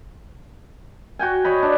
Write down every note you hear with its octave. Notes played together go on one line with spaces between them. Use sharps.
F#4 G5 G#5
C#5 D#5 B5
D4